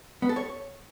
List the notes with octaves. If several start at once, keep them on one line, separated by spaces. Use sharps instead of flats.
B3
A4
C#5